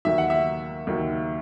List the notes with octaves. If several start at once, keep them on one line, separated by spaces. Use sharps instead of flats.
D#2 D#3 F#3 E5
F#5
E5
D#2 D#3 F#3